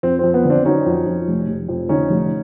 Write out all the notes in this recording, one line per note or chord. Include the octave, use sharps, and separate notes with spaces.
F2 C4
F2 C4
B3
D3
C4 D4
F#3 C#4 D#4
F2
F2
F1
F1
F2
D3 C#4 D#4
F1